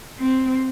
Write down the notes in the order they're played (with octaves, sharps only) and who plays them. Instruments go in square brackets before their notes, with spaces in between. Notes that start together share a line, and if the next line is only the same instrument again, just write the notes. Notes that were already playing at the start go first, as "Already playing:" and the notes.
[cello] C4